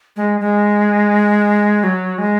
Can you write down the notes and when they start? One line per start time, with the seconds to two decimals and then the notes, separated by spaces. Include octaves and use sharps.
0.16 G#3
0.40 G#3
1.84 F#3
2.18 G#3